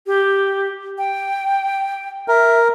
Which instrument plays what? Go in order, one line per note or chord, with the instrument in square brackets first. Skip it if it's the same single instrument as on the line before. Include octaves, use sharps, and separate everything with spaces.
[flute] G4
G5
[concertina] A#4 [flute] E5